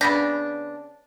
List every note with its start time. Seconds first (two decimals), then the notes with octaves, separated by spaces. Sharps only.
0.01 C#3 B3 D4 G6 A#6 B6